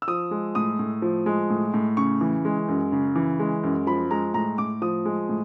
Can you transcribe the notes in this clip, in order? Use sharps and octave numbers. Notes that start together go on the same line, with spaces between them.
E6
F3 D#6
G#3
A2 D#6
A2
F3
G#3
A2
A2
C#3 C#6
E3
G#3
F#2
C#3
E3
G#3
F#2
F3 B5
G#3 A#5
A2 A#5
A2 D6
F3 D#6
G#3
A2